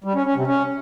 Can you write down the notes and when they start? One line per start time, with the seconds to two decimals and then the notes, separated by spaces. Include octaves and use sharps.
0.04 G3
0.15 C#4
0.26 C#4
0.36 C3
0.47 C#4